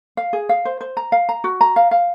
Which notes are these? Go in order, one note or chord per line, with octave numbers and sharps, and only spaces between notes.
F5
G#4
F5
C5
C5
A#5
F5
A#5
F#4
A#5
F5
F5